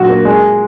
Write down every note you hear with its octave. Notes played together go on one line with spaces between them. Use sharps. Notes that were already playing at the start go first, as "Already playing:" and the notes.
Already playing: A#2 F#3 F#4
A#3
G#3